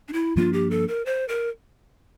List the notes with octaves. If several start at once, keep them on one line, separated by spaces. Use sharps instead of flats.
D4
E4
G2 F3 A#3 D4 F4
G4
A4
A#4
C5
A#4